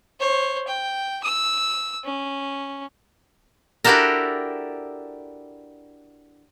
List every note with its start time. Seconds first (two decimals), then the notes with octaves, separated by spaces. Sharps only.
0.20 C5 C#5
0.68 G5
1.24 E6
2.04 C#4
3.84 D4 E4 F#4 G4 A4 A#4